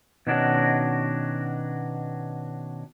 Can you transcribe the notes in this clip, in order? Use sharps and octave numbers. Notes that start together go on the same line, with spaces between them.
B2 D#3 C#4 D4 F#4 A#4